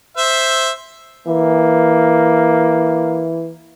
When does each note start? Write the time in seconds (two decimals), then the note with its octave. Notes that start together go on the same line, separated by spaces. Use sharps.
0.17 C5 E5
1.28 E3 A#3